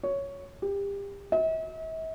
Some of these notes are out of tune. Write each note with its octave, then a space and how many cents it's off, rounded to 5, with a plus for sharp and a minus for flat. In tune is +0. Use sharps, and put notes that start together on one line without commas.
C#5 +5
G4 +30
E5 -45